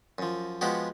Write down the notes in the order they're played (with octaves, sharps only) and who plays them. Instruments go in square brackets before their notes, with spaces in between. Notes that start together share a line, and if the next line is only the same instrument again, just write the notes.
[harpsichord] F#2 F3
F3 G#3 B3 F#4 G4